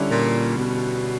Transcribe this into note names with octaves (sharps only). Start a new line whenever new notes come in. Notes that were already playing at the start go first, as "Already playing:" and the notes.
Already playing: D3 G3 C#4 E4
A#2
B2